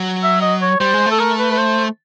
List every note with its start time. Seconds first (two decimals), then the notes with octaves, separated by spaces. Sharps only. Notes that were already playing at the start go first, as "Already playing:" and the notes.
Already playing: F#3
0.23 E5
0.41 D#5
0.61 C#5
0.80 G3 C5
0.94 G#3
1.06 A3
1.11 A4
1.20 A#4
1.39 B4
1.51 B4
1.57 C5